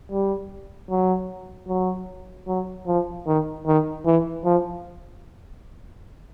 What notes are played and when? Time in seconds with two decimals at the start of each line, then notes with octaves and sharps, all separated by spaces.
0.11 G3
0.90 F#3
1.68 F#3
2.47 F#3
2.87 F3
3.27 D#3
3.67 D#3
4.05 E3
4.45 F3